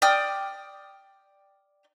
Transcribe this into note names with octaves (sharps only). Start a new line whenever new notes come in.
D5 G5 D#6 F6